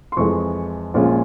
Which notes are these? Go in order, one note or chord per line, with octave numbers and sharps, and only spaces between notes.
C6
F2 E3 G#3 C#6
A#1 A#2 G#3 C#4 F4